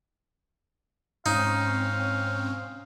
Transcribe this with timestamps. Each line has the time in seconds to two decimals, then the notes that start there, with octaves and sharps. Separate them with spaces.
1.26 G#2 C4 C#4 D#4 F5